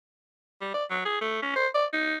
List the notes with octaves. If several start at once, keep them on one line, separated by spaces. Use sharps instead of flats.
G3
D5
F#3
G#4
A3
C#4
C5
D5
D#4